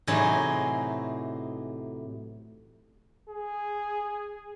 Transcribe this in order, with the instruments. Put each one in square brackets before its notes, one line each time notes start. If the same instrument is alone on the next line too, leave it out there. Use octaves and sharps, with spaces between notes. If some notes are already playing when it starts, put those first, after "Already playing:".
[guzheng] A2 C3 E3 F#3 D#4 G#4
[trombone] G#4